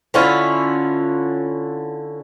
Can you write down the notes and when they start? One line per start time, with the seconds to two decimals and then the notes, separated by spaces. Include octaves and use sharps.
0.14 D3 C#4 E4 F4